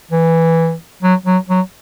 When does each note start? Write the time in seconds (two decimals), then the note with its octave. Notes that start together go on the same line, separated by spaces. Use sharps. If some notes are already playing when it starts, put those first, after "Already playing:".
0.11 E3
1.03 F#3
1.26 F#3
1.49 F#3